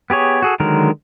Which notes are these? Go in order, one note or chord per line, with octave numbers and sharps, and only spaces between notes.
B3 G4 G#4 C#5
F#4 G#4 A4
D3 D#3 F#3 G#3 A#4